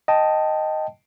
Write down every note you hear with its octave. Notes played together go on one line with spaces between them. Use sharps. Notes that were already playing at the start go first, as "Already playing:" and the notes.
D#5 G5 A5